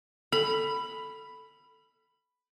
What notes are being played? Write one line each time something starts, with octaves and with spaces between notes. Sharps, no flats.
A4 B5